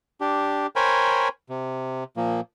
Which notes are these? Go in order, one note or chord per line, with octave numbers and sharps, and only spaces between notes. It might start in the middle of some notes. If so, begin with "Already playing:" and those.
D4 G4
A#4 C5 C#5 G5 G#5 B5
C3
A#2 F3 A#3